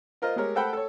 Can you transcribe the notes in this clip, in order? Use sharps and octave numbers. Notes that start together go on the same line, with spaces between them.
F4 A#4 C5 D#5
G#3 G4 A#4 C#5
A4 C5 F#5 G5 A5 B5
A4 C#5